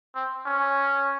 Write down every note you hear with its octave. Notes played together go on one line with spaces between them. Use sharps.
C4
C#4